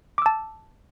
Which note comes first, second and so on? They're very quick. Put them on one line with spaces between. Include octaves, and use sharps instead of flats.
D6 E6 A5